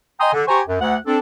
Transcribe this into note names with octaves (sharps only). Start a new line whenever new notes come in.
D#5 G5 G#5 A#5 C6 D#6
D3
G4 C5 G#5 A#5 C#6
F#2
D2 F#5
C4 D4 A4